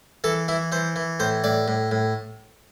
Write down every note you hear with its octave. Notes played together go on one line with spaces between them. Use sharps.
E3 A4
E3 E4
E3 C5
E3
A2 C5
A2 D5
A2
A2